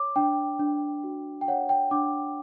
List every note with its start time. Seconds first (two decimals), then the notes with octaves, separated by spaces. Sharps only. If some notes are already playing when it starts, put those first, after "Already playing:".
Already playing: C#5 D6
0.16 D4 G5
0.59 D4
1.04 F#4
1.41 G5
1.48 C#5 F#5
1.69 G5
1.91 D4 D6